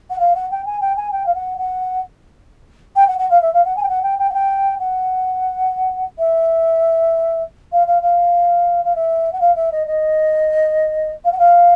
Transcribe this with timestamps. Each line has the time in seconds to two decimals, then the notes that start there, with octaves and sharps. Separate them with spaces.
0.10 F#5
0.19 F5
0.35 F#5
0.51 G5
0.65 G#5
0.81 G5
0.96 G#5
1.11 G5
1.26 F5
1.34 F#5
1.58 F#5
2.96 G5
3.07 F#5
3.18 F#5
3.30 F5
3.41 E5
3.53 F5
3.65 F#5
3.76 G#5
3.83 G5
3.88 F#5
4.02 G5
4.18 G5
4.29 F#5
4.33 G5
4.79 F#5
6.18 E5
7.72 F5
7.86 F5
8.02 F5
8.84 F5
8.95 E5
9.32 F#5
9.40 F5
9.56 E5
9.72 D#5
9.87 D#5
11.24 F5
11.32 F#5
11.38 F5